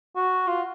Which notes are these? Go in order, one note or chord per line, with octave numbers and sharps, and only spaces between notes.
F#4
F4